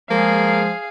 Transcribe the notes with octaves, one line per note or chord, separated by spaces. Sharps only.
F3 G#3 A#3 G#4 F5